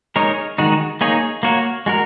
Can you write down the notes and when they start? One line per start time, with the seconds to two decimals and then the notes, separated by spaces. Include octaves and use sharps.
0.16 G#3 D#4 A#4 C#5
0.58 D#3 G#3 D#4 F#4
1.01 A#3 D#4 G#4 C#5
1.43 A#3 F#4 A#4 C#5
1.86 G#3 F#4 A#4